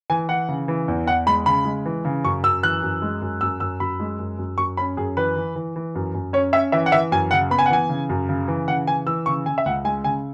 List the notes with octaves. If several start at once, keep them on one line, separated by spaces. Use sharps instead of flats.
E3 G#5
E3 F#5
C#3
E3
E2
E2 F#5
G#3 B5
C#3 B5
G#3
E3
C#3
F#2 C#6
F#2 E6
E3 F#6
F#2
G#3
F#2
F#2 E6
F#2 E6
F#2 B5
G#3
F#2
F#2
F#2 C#6
C#4 B5
F#2 G#4
E3 B4
E3
E3
E3
F#2
F#2
C#4 C#5
C#4 E5
E3 E5
F#5
E3 E5
F#2 G#5
C#3 F#5
B3 B5
G#5
F#5
E3 G#5
C#3
F#2
C#3
E3
C#3 F#5
E3 G#5
E3 E6
C#3 C#6
C#3 G#5
E5
C#2 F#5
G#3 G#5
C#3 G#5